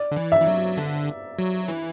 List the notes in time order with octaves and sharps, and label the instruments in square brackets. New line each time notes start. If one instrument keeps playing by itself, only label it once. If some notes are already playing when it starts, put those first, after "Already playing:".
Already playing: [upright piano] D5
[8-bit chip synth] D3
E3
[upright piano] E5
[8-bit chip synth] E3
F#3
D3
F#3
E3